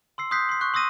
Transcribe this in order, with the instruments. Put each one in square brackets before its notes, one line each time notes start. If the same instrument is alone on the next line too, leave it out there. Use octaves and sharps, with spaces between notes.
[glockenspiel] C6 E6 C7
C6 D#6 F#6 G6 B6 C7
C6 C7
C#6 F#6 G6
C6 D#6 E6 A#6 D#7